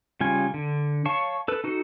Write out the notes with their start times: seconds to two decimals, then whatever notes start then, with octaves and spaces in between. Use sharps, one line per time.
0.21 C#3 G3 F4 G#5
0.54 D3
1.05 C#5 F5 A5 C#6
1.48 A4 B4
1.64 D#4 F#4 A4